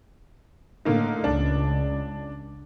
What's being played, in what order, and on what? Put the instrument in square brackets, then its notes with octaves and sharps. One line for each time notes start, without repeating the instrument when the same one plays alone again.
[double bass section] A2 [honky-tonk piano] D3 A#3 D#4
[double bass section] C#2 [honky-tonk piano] D4